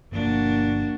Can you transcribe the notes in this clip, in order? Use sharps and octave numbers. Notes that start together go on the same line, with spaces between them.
G1 F3 A#3 D4 F#4